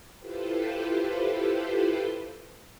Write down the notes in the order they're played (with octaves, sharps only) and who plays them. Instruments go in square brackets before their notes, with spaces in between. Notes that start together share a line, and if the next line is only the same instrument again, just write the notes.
[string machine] E4 F4 G4 A4 B4 C5